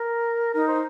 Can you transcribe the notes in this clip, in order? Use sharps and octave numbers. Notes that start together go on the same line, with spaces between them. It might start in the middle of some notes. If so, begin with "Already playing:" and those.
Already playing: A#4
D#4 A#4
C5